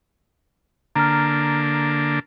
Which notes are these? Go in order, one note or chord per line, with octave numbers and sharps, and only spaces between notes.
D3 A#3 D4 A#5 F6